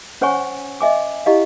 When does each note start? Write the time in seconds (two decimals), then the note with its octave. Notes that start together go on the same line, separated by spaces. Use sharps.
0.21 C#4 C5 C#5 F#5 G#5 C#6
0.81 D#5 E5 G#5 D6
1.26 E4 G4 D#5 F5